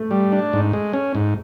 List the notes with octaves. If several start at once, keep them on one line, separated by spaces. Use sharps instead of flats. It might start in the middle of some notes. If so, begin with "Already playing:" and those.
Already playing: A3
G3
D4
G#2
G#3
C#4
G#2